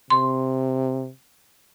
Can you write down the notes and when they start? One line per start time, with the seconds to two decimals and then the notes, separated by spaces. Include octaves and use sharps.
0.10 C3 C6